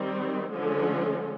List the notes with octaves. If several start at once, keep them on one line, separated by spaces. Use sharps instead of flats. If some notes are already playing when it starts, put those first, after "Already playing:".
Already playing: D#3 G3 C4
D3 F3 G#3 C#4